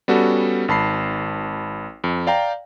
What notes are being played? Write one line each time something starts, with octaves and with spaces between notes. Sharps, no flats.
G3 B3 C#4 F#4 A4
G#1 A5 B5 C7
F2
D5 F5 G5 A#5